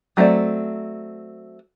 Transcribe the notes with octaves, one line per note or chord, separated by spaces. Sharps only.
F#3 A3 C4 D5